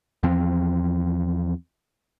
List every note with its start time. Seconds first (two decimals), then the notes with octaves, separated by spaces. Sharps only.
0.23 E2 F3 C4